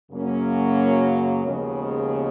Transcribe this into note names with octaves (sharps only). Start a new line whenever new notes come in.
F#2 C#3 F#3 A#3 C#4
D#2 C#3 F3 G#3 B3